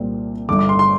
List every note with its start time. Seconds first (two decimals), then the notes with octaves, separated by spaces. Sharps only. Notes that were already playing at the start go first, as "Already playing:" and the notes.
Already playing: C2 A#2 G3 C4
0.48 G1 G2 D3 D6
0.59 D6
0.69 C6
0.79 C6